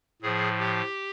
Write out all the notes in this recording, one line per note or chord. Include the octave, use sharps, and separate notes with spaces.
A2 F3 G#4
G4